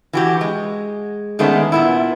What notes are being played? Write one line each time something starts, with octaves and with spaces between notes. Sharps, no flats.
E3 F#4 G4
G#3
D#3 G#3 A3 B3 C#4 D4
A#2 B3 E4